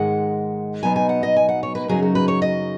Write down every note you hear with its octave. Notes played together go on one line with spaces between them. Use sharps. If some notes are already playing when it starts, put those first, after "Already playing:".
Already playing: G#2 D#3 G#3 F#5
B2 F#3 B3 D#4 G#5
G#5
F#5
D#5
G#5
F#5
C#5
B4
F#2 C#3 F#3 D#4 G#4
F#4
B4
C#5
D#5